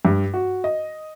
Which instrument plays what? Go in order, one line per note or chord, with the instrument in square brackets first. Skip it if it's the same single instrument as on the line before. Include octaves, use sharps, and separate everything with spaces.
[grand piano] G2
F#4
D#5